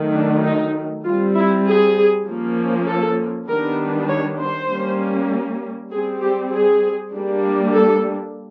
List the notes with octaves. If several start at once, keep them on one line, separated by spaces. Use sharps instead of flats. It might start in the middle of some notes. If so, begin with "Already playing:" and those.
Already playing: D#3 F#3 A3
D4
D#4
G3 C4 F4
E4
G#4
F3 A#3 C#4
A4
D#3 G3 B3 D4 A#4
C#5
C5
G3 A#3 C#4
G3 C4 G#4
G4
G#4
G3 A#3 D4
A4